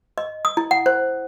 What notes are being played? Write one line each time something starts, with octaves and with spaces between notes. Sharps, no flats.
D#5
D#6
E4
F#5
C5